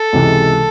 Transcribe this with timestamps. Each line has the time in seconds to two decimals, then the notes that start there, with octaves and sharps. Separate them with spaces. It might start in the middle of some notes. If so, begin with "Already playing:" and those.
Already playing: A4
0.13 C#2 C3 E3 G#3